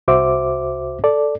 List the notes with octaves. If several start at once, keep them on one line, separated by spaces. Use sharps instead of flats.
C2 F#4 C5 E5 D6
A4 D5